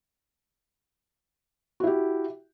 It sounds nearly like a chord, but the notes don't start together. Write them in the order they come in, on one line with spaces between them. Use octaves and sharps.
F#4 E4 G4